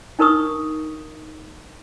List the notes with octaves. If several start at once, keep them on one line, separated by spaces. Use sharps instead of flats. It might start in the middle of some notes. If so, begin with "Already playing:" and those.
D4 D#4 A#4 B4 C#6 D#6